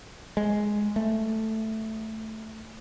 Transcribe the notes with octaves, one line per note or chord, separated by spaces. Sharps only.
G#3
A3